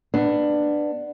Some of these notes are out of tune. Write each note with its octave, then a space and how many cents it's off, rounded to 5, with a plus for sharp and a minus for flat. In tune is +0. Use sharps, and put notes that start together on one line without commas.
B3 +0 D4 +15